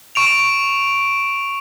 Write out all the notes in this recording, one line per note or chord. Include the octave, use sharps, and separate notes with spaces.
C#6 D7 F7